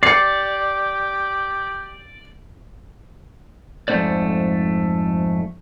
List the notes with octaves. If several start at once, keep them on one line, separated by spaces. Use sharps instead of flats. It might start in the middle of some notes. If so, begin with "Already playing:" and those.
G4 D5 C7 C#7
F2 G#2 A3 B3 C5 D5